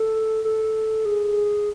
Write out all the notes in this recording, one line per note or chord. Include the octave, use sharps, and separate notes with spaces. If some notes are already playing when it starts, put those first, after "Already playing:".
Already playing: A4
A4
G#4